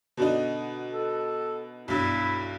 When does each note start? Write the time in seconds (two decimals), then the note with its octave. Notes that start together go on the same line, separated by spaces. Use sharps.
0.17 B2 D3 D#4
0.93 A4
1.88 B1 G2 E4